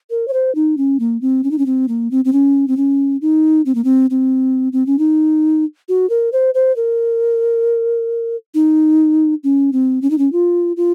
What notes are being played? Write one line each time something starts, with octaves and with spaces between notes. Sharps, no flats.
A#4
C#5
C5
D#4
C#4
A#3
C4
C#4
D#4
C#4
C4
A#3
C4
C4
C#4
C4
C#4
D#4
C4
A#3
C4
C4
C4
C#4
D#4
F#4
A#4
C5
C5
A#4
D#4
C#4
C4
C#4
D#4
C#4
F4
F4